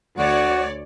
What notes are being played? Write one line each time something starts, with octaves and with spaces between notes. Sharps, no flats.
D2 F#4 C#5 D5